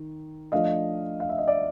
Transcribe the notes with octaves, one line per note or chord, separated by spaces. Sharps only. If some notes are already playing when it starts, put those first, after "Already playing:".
Already playing: D#3
F3 A3 D4 D#5 F5
F5
E5
D#5
D5 E5